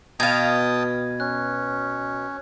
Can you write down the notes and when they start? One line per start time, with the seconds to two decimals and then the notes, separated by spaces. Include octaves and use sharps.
0.20 B2 F5 G5 A5 D#6 G#6
1.20 C#4 F#6